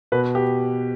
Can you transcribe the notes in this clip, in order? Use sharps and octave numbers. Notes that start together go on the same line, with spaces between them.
B2 B4
G4